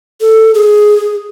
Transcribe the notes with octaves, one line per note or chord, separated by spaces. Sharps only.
A4
G#4